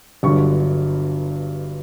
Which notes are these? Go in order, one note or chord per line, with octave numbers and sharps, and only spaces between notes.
G1 G2 D3 F#3 C#6